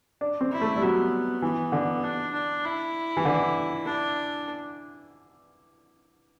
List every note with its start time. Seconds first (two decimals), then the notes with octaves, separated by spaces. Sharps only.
0.21 D4
0.41 C4
0.51 E4
0.61 A3
0.76 G3
0.81 F#3 B3
1.42 E3 B3
1.72 D3
2.03 D4
2.33 D4
2.65 E4
3.17 E3
3.25 D3
3.85 D4